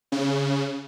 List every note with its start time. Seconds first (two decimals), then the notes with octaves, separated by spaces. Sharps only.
0.12 C#3